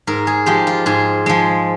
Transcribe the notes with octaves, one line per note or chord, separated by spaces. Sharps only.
G#2 A#4
G#4
F3 G#3 G4
F4
G#2 G#4
F3 G#3